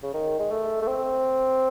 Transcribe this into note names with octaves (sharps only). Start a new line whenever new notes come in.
C#3
D#3
G#3
A3
A3
C4